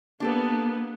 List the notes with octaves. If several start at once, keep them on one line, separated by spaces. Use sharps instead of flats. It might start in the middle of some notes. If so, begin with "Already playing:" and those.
A#3 B3 D4 G4 A4